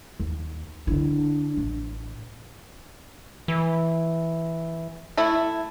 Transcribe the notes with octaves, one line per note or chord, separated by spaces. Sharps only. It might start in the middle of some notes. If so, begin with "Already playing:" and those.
D#2
D3 D4 E4
A1
E3
A3 E4